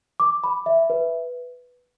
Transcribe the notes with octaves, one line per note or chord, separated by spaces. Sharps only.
D6
B5
E5
B4